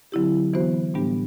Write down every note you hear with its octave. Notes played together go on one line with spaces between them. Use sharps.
D3 F#3 C4 E4 G4
E3 B3 F#4 C5
A2 G3 B3 D4 G4